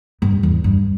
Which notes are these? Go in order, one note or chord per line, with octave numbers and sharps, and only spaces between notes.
G2
E2
G2